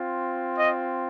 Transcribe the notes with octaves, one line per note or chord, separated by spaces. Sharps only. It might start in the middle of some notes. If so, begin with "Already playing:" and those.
Already playing: C4 F4
D#5